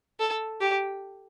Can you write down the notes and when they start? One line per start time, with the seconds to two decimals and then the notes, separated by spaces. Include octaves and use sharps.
0.20 A4
0.61 G4